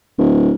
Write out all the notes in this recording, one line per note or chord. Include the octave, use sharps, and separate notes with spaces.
D1